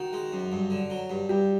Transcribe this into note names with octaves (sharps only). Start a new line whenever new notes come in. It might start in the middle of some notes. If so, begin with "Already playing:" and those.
Already playing: D#3 F#4
G#3
F#2
G2
D3
F#3
G2
G2 G4